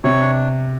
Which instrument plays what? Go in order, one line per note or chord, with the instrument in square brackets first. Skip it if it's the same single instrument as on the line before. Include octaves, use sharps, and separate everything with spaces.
[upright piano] C3 [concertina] C#5
[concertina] D4